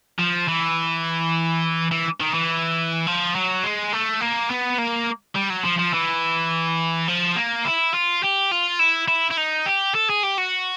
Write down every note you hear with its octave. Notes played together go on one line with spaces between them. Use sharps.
F3
E3
E3
D#3
E3
F3
F#3
G#3
A3
A#3
B3
A#3
G3
F#3
F3
F3
E3
F3
A#3
E4
F4
G4
F4
E4
E4
E4
D#4
G4
A4
G#4
G4
F#4